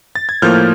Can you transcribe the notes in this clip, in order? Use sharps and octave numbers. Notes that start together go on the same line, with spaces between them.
A6
G#6
A2 F3 A#3 F6 G6